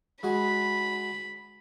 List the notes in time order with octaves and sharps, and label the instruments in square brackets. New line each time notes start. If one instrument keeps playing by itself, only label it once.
[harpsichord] G#3 F#4 G#5 [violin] B5